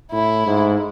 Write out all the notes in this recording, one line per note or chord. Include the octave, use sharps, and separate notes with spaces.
A2 E4
G#2